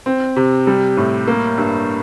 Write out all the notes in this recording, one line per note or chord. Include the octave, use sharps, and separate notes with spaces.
C4
C3
G3
A2
A#3
G2